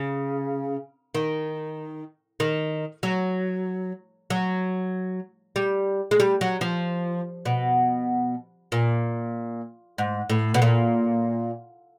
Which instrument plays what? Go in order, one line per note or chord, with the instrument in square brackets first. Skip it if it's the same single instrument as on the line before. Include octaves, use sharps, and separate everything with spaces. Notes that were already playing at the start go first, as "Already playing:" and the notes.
Already playing: [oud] C#3
D#3
D#3
F#3
F#3
G3
G#3
G3
F#3
F3
B2
A#2
G#2
A2
B2
A#2